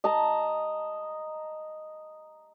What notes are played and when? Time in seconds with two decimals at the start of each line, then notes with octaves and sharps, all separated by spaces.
0.04 D#5 A5 A#5